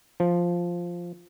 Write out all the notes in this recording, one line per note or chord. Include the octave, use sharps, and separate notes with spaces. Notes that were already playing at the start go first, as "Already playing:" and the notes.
F3